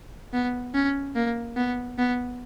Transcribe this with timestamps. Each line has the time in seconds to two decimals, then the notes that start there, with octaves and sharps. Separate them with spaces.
0.33 B3
0.74 C#4
1.16 A#3
1.57 B3
1.98 B3